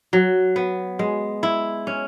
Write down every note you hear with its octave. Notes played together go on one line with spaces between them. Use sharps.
F#3
B3
G#3
E4
C#4